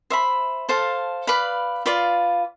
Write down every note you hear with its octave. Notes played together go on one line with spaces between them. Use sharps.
C5 E5 B5
A4 C5 F5 A5
B4 D5 F5 B5
F4 B4 D5 F5